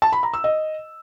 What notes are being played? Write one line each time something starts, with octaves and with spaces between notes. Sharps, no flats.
A5
B5
A#5
E6
D#5